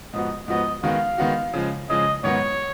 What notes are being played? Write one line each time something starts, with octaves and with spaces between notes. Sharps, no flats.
G#2 F3 B3 F#4 D#5
G#2 F3 B3 F#4 D#5
D#3 G#3 B3 F#4 F5
D#3 G#3 B3 F#4
C#3 F3 G#3
C#3 F3 G#3 D#5
G#2 D#3 F#3 B3 F#4 C#5